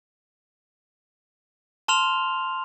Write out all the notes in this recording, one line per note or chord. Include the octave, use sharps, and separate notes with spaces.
A5 C6 F6 F7